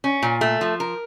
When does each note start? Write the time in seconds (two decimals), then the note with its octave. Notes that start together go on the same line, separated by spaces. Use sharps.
0.04 C#4
0.23 A#2
0.41 A3
0.61 F3
0.80 A#4